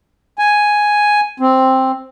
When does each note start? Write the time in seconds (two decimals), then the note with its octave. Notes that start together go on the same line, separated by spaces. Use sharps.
0.39 G#5
1.40 C4